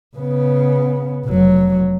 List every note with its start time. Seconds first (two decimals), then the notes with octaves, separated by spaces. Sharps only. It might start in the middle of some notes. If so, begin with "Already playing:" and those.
0.17 C#3 B3
1.26 F1 F#3